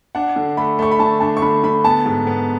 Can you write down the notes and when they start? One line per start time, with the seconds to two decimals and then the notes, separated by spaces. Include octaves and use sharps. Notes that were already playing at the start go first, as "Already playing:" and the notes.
0.15 D4 F#5
0.36 D3
0.57 A3 B5
0.79 A3 C#6
0.91 B5
0.99 D3 A5
1.20 D4 A5
1.37 C#6
1.42 D3 B5
1.63 D3 B5
1.84 B3 A5
2.05 G#2
2.27 B3